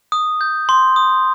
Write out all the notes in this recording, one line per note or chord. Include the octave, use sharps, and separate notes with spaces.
D#6
G6
C6
D#6